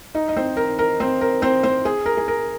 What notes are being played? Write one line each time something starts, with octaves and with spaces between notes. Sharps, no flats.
D#4 D#5
D#5
C4 C5
A#4
A#4
C4 C5
A#4
C4 C5
C4 C5
G#4
A#4
G#4
A#4